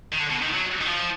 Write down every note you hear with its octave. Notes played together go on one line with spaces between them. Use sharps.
D#3
D3
B2
D#3
F#3
D#3
F3